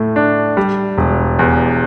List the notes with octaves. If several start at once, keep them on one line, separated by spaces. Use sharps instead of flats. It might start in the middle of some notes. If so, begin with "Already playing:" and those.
Already playing: A2 A3
D4
G3
E1
E2